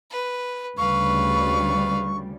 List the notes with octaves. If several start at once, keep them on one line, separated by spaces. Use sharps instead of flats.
B4
D2 C#3 G3 B4 F5 C#6